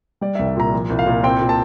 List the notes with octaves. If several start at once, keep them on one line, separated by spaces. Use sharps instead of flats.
G3 D5
E5
C2
E5
A#2 A#5
F3
C2
F5
A#2
C4 G5
A#2
A5